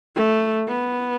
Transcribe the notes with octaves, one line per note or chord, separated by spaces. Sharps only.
A3
B3